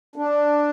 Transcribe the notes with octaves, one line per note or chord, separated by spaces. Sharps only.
D4